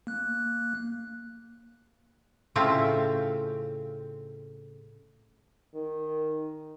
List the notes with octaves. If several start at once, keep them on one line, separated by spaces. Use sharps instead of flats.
A#3 F#6
A2 C#3 C4 F4 E5 A5
D#3